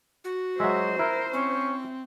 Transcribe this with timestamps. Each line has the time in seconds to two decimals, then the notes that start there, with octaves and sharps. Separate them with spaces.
0.24 F#4
0.60 F#3 G#3 C5 E5
0.99 E4 A#4
1.33 C4 C#4